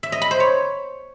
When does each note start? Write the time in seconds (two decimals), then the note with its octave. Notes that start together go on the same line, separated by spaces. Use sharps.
0.03 E5
0.12 D#5
0.22 B5
0.31 C5
0.40 C#5